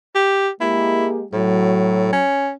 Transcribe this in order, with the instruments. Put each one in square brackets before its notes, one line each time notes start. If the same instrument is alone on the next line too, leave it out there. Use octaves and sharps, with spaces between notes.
[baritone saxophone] G4
[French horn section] G#3 A#3 G4 [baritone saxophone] E4
[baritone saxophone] A2 [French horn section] F#3
[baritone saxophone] C#4